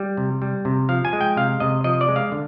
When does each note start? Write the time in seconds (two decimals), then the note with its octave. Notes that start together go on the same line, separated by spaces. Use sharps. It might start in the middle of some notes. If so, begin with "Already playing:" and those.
Already playing: G3
0.17 C3
0.42 G3
0.65 C3
0.89 F3 F5
1.05 G#5
1.13 G#3
1.21 G5
1.37 C3 F5
1.60 C3 D#5
1.84 F3 D#5
2.01 D5
2.08 G#3
2.16 F5
2.32 D3